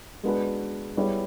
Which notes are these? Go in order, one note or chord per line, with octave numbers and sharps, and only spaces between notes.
G#3 B3 D4 F#4 B4
G3 B3 E4 G#4 C#5